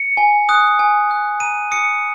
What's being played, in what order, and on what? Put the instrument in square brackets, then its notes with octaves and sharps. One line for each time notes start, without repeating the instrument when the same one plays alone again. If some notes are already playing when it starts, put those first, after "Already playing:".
Already playing: [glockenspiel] C#7
G#5
D#6 F#6
G#5
D#6 F#6
A#5 D#7
D#6 F#6 C#7